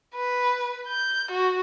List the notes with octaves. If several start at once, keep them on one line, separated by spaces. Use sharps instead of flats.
B4
G6
F#4